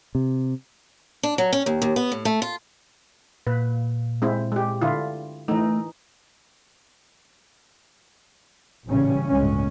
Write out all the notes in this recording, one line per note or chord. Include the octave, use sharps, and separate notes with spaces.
C3
D4
F#3
C#4
D#2
D#2
B3
A2
A3
F4
A#2 B4
G#3 C4 E4
G#3 G4
D3 E4 F4
E3 A3 D#4
A1 A#2 C#3 E3 G3 C#4
G1 C#2 A2 G#3 C#4